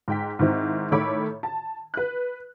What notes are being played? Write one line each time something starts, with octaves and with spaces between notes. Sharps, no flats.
G#2 G5 B6
G#2 D#3 C4 E4
A2 D#3 A4 C#5 B5 D6
A5
B4 F#6